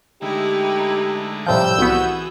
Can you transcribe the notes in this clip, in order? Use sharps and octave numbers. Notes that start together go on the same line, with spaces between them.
D3 G#3 A3 D#4 E4 G4
A2 C3 F3 G3 E6 G6
C2 E3 B3 F#4 G#4